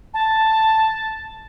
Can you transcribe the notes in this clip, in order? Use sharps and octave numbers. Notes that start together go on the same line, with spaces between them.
A5